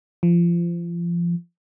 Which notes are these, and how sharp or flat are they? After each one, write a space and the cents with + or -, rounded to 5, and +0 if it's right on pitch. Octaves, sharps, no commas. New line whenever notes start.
F3 -25